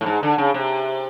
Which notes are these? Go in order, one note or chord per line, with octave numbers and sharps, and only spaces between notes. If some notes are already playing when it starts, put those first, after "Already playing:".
A2
G#2
D3
C#3
C3